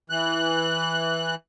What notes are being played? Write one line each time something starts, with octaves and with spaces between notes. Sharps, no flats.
E3 F#6